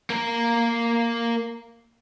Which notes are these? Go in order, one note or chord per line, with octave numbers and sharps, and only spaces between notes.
A#3 A#4